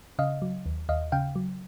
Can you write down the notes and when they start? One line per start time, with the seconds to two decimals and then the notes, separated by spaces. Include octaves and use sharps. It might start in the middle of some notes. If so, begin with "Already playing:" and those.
0.19 C#3 D#5 F5
0.42 F#3
0.66 D#2
0.89 D#2 D#5 F5
1.12 C#3 F5 G5
1.36 F#3